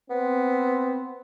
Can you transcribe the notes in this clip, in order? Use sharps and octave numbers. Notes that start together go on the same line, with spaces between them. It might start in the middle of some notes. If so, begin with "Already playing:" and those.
B3 C4